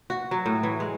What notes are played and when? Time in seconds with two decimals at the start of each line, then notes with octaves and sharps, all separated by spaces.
0.10 F#4
0.31 F#3
0.46 A2
0.63 E3
0.80 G#3